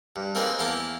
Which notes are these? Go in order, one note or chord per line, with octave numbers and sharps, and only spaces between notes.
G2
A#3 C4 D#4 G#4 A#4 B4
E2 A#3 E4 F5 G5 A5